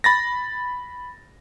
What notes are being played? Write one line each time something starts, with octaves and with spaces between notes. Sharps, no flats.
B5 A6 A#6